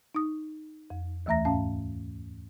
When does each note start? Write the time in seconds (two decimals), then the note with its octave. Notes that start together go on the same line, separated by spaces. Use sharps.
0.15 D#4 D#6
0.90 F2
1.26 D#2 E3 A3 E5 A#5 A#6
1.45 G#2 C#4 F5 A5